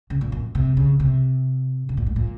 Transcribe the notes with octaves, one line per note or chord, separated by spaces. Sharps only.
C#3
A#2
F#2
C3
C#3
C3
C3
A#2
G#2
A#2